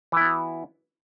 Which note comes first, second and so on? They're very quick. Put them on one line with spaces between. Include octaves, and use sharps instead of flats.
E3 E4 B3 F#4